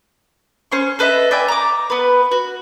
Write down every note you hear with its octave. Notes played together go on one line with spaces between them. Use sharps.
C#4 C5 C6 C#6
A4 B4 D#5 E5
D5 E5 G5 G#5
A#5 D6
B3 B4
F#4